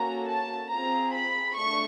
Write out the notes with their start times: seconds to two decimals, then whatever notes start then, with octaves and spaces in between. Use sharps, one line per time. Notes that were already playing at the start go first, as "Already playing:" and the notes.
Already playing: A#3 C#4 F#4 A4 A#5
0.27 A5
0.70 C4 F4 G#4 A#5
1.13 B5
1.56 A3 D4 C#6